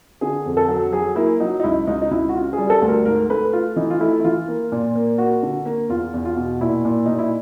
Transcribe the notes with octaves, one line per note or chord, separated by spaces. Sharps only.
D3 G#4
F2
A4
F#3
F#3 G#4
A#3 E4
F#3 D#4
D#4
C#2 E4
C#2 D#4
D#4
C#2 E4
F#4
C#3 F4
G#4
G3
A4
D2
A#4
G#2 A#4
A3 B4
A3 F4
E3 D#4
F4
A3 E4
E4
E3 F4
A#3
A#2
A#3
A#3 F#4
D3
A#3
E2 F4
E2
F4
B2
A#2 E4
A#2
A#2 D#4
E4